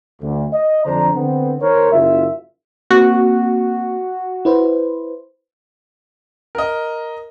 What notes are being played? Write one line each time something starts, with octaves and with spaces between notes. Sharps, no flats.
D2
D#5
F2 D3 D4 C5 A#5
D3 B3 C4
D#2 A#4 C5 C#5
F#1 F4 E5
A#3 C4 F#4
E4 B4 C5
A#4 D#5